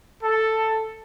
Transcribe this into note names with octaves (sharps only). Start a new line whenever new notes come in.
A4